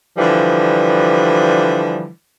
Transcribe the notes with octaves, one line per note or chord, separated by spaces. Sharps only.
D3 E3 F3 G3